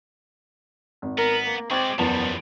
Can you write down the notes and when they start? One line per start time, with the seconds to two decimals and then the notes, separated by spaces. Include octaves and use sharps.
1.02 G#1
1.18 B3 A#4
1.46 A#3
1.71 G#3 C4 D5 C#6 D6 G#6
1.99 F#1 E2 F3 G3 B3 A5